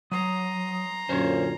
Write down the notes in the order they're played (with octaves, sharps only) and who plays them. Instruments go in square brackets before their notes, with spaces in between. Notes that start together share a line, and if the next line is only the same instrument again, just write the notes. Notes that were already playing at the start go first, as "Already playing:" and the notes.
[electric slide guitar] F#3 [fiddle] A#5 C6 [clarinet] D#6
[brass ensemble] F#2 A#2 D3 [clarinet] C#4 [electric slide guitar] C5 C#5